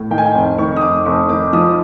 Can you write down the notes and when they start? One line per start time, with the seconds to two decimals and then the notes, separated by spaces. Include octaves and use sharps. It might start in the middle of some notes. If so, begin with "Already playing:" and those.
Already playing: A2
0.11 D#3 G5
0.18 G#5
0.26 G5
0.34 F1
0.58 D#3 C#6
0.76 D#6
0.81 F1 D6
1.06 F1 C#6
1.29 D#3 D6
1.53 F3 D#6